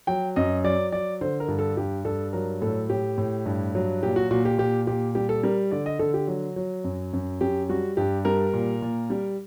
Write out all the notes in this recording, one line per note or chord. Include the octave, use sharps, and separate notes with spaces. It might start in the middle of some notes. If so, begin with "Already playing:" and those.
F#3 G5
F#2 D#5
F#3 D5
F#3 D5
D3 C5
A#4
G2
A4
G2 G4
G2 A4
F#3 A#4
A2 A4
A2 G4
A2
G2
F#3
A#2 G4
F#4
A#2 F#4
G4
A#2 G4
A#2 G4
G3 G4
A4
G3 A#4
D3 D5
D#5
D3 A4
G4
F#3
F#3
F#2
F#2
F#2 G4
G3 F#4
G2 G4
G3 A#4
A#2
A#2
G3